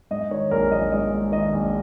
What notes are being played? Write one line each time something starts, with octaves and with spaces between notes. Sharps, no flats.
G#2 D#5
D#3 C#5
A#1 A#4
A#1 D#5
G#2 D#5
G#2
D#3 D#5
A#1